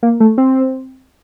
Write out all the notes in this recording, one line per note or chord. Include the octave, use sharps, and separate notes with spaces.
A#3
A3
C4